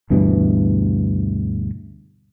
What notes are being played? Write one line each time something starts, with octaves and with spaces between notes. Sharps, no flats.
D2 G2 B2 E3